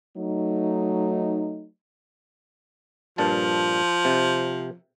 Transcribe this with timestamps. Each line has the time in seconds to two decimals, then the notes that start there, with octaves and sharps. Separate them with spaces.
0.17 F#3 A3 D#4
3.18 G2 A#2 F3 A5
4.05 C3